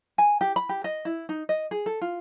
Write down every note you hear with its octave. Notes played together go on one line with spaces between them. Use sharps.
G#5
G4
B5
G4
D#5
E4
D#4
D#5
G#4
A4
F4